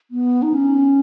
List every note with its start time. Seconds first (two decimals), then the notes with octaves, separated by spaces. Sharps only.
0.11 B3
0.42 D#4
0.53 C#4